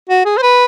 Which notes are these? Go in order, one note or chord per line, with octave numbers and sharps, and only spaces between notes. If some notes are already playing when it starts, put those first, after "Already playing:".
F#4
G#4
C5
B4